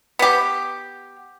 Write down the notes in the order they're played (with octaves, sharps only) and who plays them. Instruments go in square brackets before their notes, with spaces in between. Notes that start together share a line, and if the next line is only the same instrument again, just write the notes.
[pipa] B3 G4